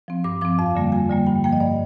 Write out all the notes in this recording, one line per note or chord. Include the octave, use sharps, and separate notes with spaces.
F3 C4
G2 D6
F3 C4 D6
F2 F5
D3 G3 A#3
F2 G#5
D3 G3 A#3
G2 G5
F3 A#3 G5
D#5
G2 D5